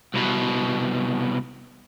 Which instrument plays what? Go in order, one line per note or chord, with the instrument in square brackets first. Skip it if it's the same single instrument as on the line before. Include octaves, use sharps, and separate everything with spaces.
[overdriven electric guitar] C2 B2